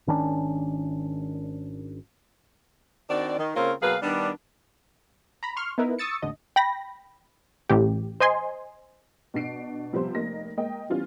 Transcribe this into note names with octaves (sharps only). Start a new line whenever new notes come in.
G#1 D#3 C#4 D4
D#3 C4 D4 F#4 D5
D#3
C#3 A#3 C4 F4 A#4 C#5
B2 F#3 A#3 G#4 B4 F5
D#3 G3 B3 D4
A#5 B5
C6 C#6 F6
B3 D#4 E4 A#4 B4
C#6 D#6 E6 A6 C#7
A1 D#2 D3 D#5
G5 B5 A#6
A1 G4
C5 D#5 G#5 C6
B2 D4 C7 D7
C3 F3 G3 B3 C5
F1 A#3 D#4 A#6
G#3 A#3 D#5 G5
E3 G3 B3 C#4 F4